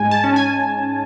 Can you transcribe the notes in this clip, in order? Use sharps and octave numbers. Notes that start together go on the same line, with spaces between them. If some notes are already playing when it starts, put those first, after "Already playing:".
Already playing: G#2 G#3 G#5
A5
C#4
G#5